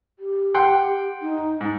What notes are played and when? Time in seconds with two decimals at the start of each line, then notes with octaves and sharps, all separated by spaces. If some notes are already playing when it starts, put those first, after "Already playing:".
0.19 G4
0.54 F#5 G5 C6
1.22 D#4
1.61 G#2